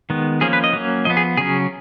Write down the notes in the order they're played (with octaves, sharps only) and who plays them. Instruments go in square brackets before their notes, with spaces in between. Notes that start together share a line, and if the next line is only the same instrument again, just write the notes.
[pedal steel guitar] D#3 G#3 B3
F3 A#3 C#4 G#4
B4
D#5
F#3 A#3 C#4
F3 B3 D#5
G#4
C#3 F#3 C#4 G#4